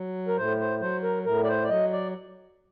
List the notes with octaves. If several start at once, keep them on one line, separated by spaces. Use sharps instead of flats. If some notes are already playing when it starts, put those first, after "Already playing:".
Already playing: F#3
A#4
A2 C5
C5
F#3 C5
A#4
A2 A#4
D5
C5
D5
F#3 D#5
D5